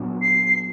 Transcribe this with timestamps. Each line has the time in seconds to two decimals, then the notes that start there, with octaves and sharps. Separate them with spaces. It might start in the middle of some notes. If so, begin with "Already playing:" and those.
Already playing: A#2 F#3 B3 D4
0.22 C7